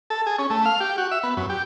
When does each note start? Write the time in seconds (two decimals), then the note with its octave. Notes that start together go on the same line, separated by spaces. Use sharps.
0.10 A4
0.27 G#4
0.39 C#4
0.50 A3
0.66 F5
0.80 G4
0.98 F#4
1.11 E5
1.23 B3
1.37 F#2
1.50 G4